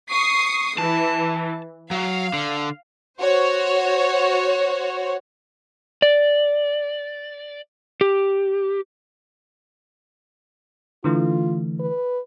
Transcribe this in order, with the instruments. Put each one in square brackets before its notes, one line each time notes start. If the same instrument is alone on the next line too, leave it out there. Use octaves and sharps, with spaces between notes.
[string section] C#6 D#6 C7
[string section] E3 [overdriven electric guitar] A5
[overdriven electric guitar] F#3 [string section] F5
[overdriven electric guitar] D3
[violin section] F#4 C5 C#5
[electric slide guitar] D5
G4
[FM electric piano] D3 E3 A3 [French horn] F4
[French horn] B4